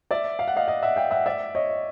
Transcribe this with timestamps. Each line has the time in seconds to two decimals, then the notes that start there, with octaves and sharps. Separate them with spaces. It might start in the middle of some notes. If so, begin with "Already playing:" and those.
0.11 D5 E5
0.39 F5
0.48 F#5
0.56 D#5 F5
0.68 D#5 F5
0.83 E5 F#5
0.96 F5 G5
1.11 E5 F#5
1.26 D5 E5
1.55 C#5 D#5